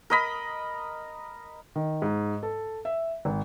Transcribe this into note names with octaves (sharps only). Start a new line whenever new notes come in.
A#4 D#5 B5
D#3
G#2
A4
E5
G#1